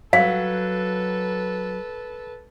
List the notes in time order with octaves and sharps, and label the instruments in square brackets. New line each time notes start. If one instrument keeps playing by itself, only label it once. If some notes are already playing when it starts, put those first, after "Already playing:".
[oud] F#3 [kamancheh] A4 B4 [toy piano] F5